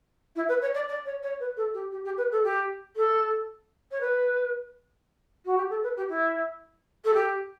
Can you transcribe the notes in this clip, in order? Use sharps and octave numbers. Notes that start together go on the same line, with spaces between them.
E4
B4
C#5
D5
D5
C#5
C#5
B4
A4
G4
G4
G4
B4
A4
G4
A4
C#5
B4
F#4
G4
A4
B4
G4
E4
A4
G4